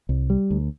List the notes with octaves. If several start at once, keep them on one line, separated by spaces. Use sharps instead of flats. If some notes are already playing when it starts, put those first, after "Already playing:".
C2
G3
D2